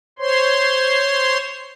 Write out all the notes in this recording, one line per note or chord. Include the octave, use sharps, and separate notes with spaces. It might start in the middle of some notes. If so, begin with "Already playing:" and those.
C5 C#5 C6